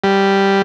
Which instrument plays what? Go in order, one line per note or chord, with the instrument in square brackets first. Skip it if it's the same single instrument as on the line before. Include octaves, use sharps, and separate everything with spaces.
[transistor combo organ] G3